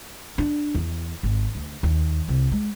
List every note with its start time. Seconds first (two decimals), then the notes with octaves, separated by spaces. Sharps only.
0.38 D4
0.75 E2
1.23 G#1
1.55 D2
1.83 D#2
2.28 C2
2.52 G#3